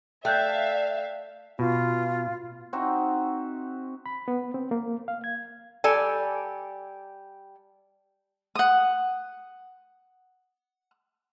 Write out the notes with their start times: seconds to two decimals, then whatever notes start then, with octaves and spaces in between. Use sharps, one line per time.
0.25 A3 D5 E5 F5 G5 F#6 G6
1.59 B2 F4
2.73 C4 D#4 F#4 E5
4.06 B5
4.28 B3
4.54 C4
4.71 A#3
5.08 F5
5.24 G#6
5.84 G3 A4 D5 G#5
8.55 F#5 D#6